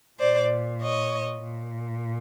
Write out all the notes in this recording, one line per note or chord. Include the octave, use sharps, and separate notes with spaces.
A#2 C5 D5
C#5 D#5
A#2